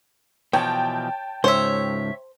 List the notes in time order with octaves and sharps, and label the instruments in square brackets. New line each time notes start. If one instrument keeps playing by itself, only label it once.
[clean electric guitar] B2 E3 F3 [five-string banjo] C#5 [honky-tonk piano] G5 A5
[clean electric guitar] C#2 G#2 [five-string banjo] C5 [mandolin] C#5 E5